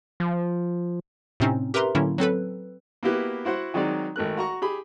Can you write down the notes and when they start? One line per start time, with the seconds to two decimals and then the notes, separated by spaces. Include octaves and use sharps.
0.20 F3
1.40 A2 C3 C4 C#4 D#4
1.74 G4 A#4 B4 E5 A#5 C6
1.95 A2 D3 F#3 A#3 C#4 E4
2.18 F#3 C4 A4 B4
3.03 A#3 B3 E4 F#4 G4 B4
3.45 E4 F#4 C5 F#5
3.74 D#3 F#3 G#3 C4 D#4 D5
4.16 G#1 A3 A#4 F#6
4.37 F#4 A#5 C#6
4.62 G4 G#4 B5